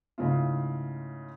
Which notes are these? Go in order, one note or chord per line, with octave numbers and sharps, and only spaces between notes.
G#2 C#3 A3 E4 F4